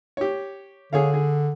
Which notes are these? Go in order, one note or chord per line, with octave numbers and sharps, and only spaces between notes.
G4 C#5
D3 G#4 C#5 F5
G#4